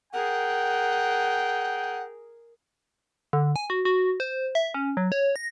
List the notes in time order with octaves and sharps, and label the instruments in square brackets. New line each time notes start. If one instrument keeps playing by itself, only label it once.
[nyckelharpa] G#4 A#4 [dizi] F#5 [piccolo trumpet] G5
[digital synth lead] D3
G#5
F#4
F#4
C5
E5
C#4
F#3
C#5
A#6